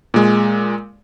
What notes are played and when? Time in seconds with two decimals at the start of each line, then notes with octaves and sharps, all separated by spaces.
0.14 A#2 G#3